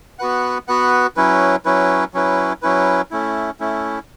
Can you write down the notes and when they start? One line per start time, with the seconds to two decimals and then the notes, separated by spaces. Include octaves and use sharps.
0.19 B3 F#4 B4 F#5
0.68 B3 F#4 B4 F#5
1.16 F#3 C#4 E4 B4
1.65 F#3 C#4 E4 B4
2.14 F#3 C#4 E4 B4
2.62 F#3 C#4 E4 B4
3.11 A3 C#4 E4
3.60 A3 C#4 E4